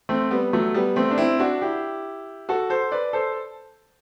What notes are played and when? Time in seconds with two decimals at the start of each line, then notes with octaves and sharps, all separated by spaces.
0.09 A3 C4
0.31 G3 B3
0.53 F#3 A3
0.74 G3 B3
0.96 A3 C4
1.11 D4
1.18 C4 E4
1.39 D4 F#4
1.62 E4 G4
2.49 F#4 A4
2.70 A4 C5
2.92 B4 D5
3.13 A4 C5